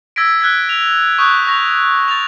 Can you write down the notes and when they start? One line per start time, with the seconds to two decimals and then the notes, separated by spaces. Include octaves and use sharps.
0.16 E6 G#6 A#6 B6 D7
0.41 F6 F#6 G#6 B6
0.69 F7
1.18 C#6 D#6 F#6 G6
1.47 C#6 A#6 F7
2.08 A6 F7